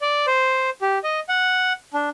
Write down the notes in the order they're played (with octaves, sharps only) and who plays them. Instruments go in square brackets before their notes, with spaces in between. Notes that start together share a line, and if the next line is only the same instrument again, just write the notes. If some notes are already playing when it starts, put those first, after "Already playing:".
[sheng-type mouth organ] D5
C5
G4
D#5
F#5
D4